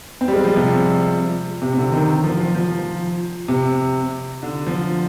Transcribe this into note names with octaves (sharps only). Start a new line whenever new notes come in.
C4
G3
G#3
F3
C3
C3
C3
D3
D#3
F3
F3
F3
C3
D3
F3